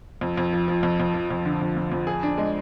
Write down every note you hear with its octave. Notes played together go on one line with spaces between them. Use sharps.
F2
F2
F3
F3
F2
F2
F3
F2
D3
F2
F2
F2
G#4
D4
G#3